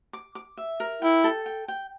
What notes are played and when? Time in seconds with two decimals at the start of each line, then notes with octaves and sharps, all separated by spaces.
0.13 D6
0.35 D6
0.57 E5
0.80 A#4
1.02 E4 G5
1.24 A4
1.46 G5
1.68 G5